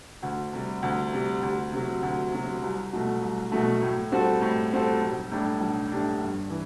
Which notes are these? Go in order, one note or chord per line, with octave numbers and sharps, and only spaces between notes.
D2
C3 G3
D2
C3 G3
D2
C3 F#3
D2
C3 F#3
C2
B2 F#3 A3
C2
B2 F#3 A3
A2
G3 C4 F#4 A4
A2
G3 C4 F#4 A4
B1
A2 G3 D4 G4
B1
A2 G3 D4 G4
G2
E3